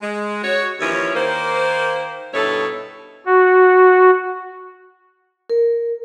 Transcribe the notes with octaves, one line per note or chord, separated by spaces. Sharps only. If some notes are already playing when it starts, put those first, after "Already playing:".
G#3
F#4 C#5
D#2 E3 F3 C#4 E4 C#5
D#3 A#3 C5
G2 B2 D#4 E4 A4 C#5
F#4
A#4